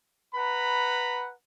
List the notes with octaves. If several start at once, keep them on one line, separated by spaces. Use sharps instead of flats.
B4 F#5 A#5 B5